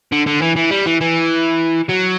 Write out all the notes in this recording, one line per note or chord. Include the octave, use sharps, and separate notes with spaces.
D3
D3
E3
E3
G3
E3
E3
F#3